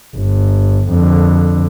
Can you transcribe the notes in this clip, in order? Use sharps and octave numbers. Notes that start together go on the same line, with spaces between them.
G1
F2 D3